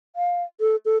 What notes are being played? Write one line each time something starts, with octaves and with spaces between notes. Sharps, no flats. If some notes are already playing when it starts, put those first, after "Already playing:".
F5
A4
A4